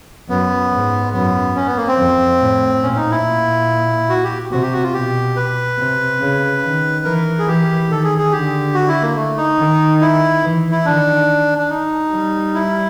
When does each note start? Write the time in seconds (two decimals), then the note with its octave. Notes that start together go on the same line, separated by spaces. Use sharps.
0.29 F#2 B3
0.72 G#2
1.13 F#2 B3
1.56 C#4
1.66 B3
1.77 A#3
1.87 C4
1.98 F2
2.40 A2
2.82 A#2 C#4
2.96 D#4
3.11 E4
3.25 A#2
4.09 F#4
4.24 G4
4.51 C3 F#4
4.62 G4
4.73 F#4
4.83 F4
4.94 B2 G4
5.36 B4
5.78 C3
6.20 C#3
6.63 D#3
7.05 E3 A#4
7.39 G#4
7.47 E3 G4
7.89 D#3 A4
8.04 G#4
8.18 G#4
8.32 D3 G4
8.74 F#4
8.88 E4
9.02 A#3
9.16 A3
9.37 D#4
9.58 D#3
10.01 E4
10.43 E3
10.71 E4
10.85 D#3 D4
11.58 D4
11.70 D#4
12.12 G3
12.55 E4